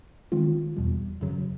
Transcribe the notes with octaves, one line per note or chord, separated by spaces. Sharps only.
D#3 G#3 C4 F4
E2 B2 G3
F#2 C#3 F#3